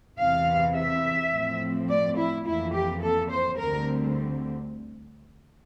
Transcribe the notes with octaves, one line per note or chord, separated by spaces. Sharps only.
E2 C3 E3 F5
E5
A2 F3 A3 C4
D5
E4
F2 E3 A#3 E4
G4
A4
C5
D2 D3 G3 C4 A#4